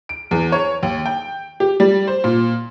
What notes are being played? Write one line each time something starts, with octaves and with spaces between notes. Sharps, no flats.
D7
E2
C#5
D#2
G5
G4
G3
C5
A#2